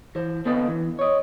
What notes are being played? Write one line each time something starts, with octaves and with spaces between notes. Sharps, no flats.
E3 C5
D3 B3 C4 B4 D#5 F5
E3
C#5 D#5